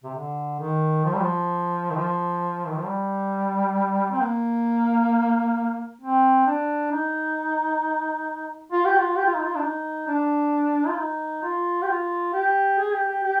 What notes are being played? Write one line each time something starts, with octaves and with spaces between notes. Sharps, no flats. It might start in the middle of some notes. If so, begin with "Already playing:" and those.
C3
D3
D#3
F3
G3
F3
D#3
F3
D#3
F3
G3
C4
A#3
C4
D4
D#4
F4
G4
F4
G4
F4
D#4
F4
D4
D#4
D4
F4
D#4
F4
G4
F4
G4
G#4
G4
G4
G4